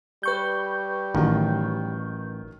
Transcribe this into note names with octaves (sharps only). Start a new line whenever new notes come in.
G3 B4 C#6 G6
A1 D#3 F#3